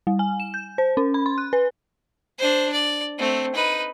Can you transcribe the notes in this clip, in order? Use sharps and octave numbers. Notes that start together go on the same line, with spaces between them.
G3
G#5
E7
G6
C5
C#4
B5
C6
F#6
B4
D4 C5
D5
A3 C4
D#4 B4